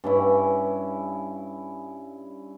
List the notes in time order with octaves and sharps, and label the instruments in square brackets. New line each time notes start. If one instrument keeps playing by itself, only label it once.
[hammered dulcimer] G2 C#4 E4